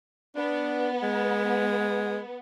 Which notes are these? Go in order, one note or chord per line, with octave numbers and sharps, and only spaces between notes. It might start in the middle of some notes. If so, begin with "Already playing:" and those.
B3 D4
G#3